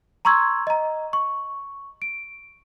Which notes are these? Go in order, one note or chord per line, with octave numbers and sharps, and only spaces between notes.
A#5 C6 C#6 E6 G#6
D#5 A#5
C#6
D7